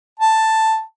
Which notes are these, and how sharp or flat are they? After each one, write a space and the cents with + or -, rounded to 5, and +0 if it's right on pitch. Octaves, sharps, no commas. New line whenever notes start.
A5 +5